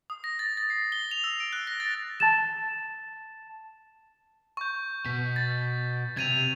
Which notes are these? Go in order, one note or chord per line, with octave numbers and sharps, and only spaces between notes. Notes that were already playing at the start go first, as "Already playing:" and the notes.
D#6
A#6
A6
A6
C7
G7
F7
E6
D7
F#6
A#6
A6
A5 A6 E7
C#6 G6
B2 B6
A6
C3 G#6 D#7 F7